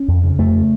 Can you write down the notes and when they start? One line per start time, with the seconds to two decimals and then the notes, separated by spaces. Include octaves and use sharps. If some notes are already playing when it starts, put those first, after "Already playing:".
Already playing: C#4
0.08 F2
0.24 C#3
0.39 F2 A3
0.54 C#3